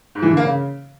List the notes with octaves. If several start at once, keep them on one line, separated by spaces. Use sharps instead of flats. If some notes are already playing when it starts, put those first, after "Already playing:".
G#2
E3
D3
A#3
C#3